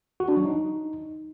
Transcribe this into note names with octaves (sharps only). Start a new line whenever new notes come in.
F#4
D4
F#3
D#4